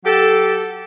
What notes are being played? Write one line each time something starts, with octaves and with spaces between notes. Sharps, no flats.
F#3 G4 A4